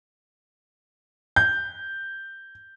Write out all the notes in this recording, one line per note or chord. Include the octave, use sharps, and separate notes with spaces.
G6